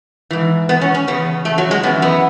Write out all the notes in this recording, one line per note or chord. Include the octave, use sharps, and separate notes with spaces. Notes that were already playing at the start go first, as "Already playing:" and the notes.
G#2 E3
B3
C#4
C#4
E2 C#3 B3
A3
F#3
G#3
F#2 E3 B3
B3